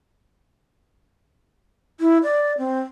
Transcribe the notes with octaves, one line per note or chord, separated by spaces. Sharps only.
E4
D5
C4